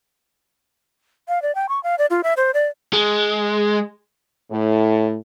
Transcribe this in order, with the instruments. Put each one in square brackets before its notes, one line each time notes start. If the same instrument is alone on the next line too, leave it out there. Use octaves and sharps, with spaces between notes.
[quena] F5
D5
G5
C#6
F5
D5
F4
E5
C5
D5
[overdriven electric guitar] G#3
[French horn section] A2